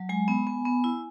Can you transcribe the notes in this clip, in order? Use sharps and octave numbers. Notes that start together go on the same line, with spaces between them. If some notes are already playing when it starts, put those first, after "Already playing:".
Already playing: F#3
G#3 G#5
B3
B3
B3
E4